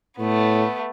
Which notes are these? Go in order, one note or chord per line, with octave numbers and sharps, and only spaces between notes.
A2 A3 B3